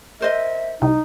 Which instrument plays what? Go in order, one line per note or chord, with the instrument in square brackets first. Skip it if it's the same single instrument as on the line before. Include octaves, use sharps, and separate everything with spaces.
[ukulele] A#4 C5 D#5 [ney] E5
[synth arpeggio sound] C2 [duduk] D#4